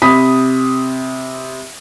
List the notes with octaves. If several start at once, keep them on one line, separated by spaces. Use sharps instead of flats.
C3 B5 D#6 B6